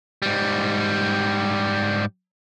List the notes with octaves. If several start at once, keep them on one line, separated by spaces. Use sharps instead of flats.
G#2 G3